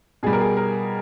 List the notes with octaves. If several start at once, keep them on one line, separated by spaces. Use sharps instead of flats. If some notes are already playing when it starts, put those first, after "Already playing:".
B2 G3 G#4
A#4
G#4
A#4